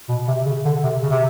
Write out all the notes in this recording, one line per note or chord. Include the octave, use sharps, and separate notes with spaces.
B2
C3
C#3
D3
C3
C#3
C3